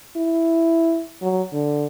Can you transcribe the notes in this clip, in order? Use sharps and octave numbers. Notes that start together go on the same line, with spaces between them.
E4
F#3
D3